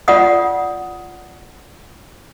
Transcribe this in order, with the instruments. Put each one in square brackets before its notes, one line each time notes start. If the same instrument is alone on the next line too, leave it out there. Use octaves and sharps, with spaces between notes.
[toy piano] F4 D5 F#5 D#6